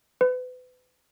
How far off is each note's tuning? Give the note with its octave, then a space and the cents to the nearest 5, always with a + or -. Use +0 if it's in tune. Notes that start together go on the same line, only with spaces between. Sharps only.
B4 +35